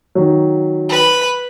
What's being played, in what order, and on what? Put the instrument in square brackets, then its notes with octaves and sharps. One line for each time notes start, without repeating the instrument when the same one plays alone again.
[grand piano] D#3 F#3
[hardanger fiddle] B4 B5